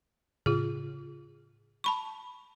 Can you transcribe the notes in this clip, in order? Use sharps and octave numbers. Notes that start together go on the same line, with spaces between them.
A2 C#3 F4 G#4
A5 B5 C#6